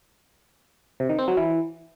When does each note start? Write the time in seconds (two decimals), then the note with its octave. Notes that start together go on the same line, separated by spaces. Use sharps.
1.00 C3
1.09 D#3
1.19 C4
1.28 F#3
1.37 E3